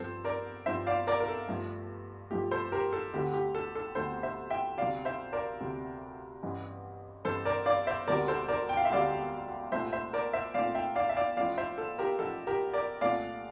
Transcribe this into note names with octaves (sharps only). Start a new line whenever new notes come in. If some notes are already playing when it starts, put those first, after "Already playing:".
Already playing: G2 F3 C4 A4 C5
A#4 D5
G2 F3 C4 C5 E5
D5 F5
A#4 D5
A#4
A4
G2 F3 A3
G2 F3 A3 G4
A4 C5
G4 A#4
A4
D2 D3 A3 C4 G4
G4
A4
A4
D2 D3 A3 C4 A4 C5
C5 E5
E5 G5
D2 C3 G3 D5 F5
C5 E5
A#4 D5
D2 C3 G3
A1 G2 E3
A1 G2 E3 A4 C5
A#4 D5
D5 F5
C5 E5
E1 D2 D3 G3 C4 A#4 D5
A4 C5
A#4 D5
G5
F5
E5
E1 D2 D3 G3 C4 D5 F5
C2 A#2 A3 C4 C5 E5
C5 E5
A#4 D5
C5 E5
C2 A#2 A3 C4 D5 F5
E5 G5
D5 F5
E5
D5 F5
A1 A2 F3 D5 F5
C5 E5
A4
G4 A#4
A1 A2 F3 A4
G4 A#4
A#4 D5
C2 A#2 A3 D5 F5